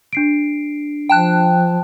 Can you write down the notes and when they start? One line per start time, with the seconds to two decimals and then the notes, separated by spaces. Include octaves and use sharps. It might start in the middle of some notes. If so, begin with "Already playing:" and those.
0.13 D4 C7 D7
1.09 F3 G5 A5 F#6